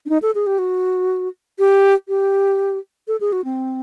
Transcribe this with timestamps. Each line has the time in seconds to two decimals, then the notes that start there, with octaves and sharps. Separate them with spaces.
0.06 D4
0.09 D#4
0.22 A4
0.35 G#4
0.47 G4
0.59 F#4
1.59 G4
2.08 G4
3.08 A4
3.21 G#4
3.32 F#4
3.45 C4